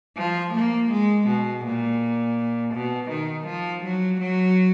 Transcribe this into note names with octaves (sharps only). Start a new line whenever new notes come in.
F3
A#3
G#3
B2
A#2
B2
D#3
F3
F#3
F#3